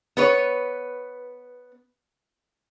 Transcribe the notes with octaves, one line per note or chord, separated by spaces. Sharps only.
B3 B4 C#5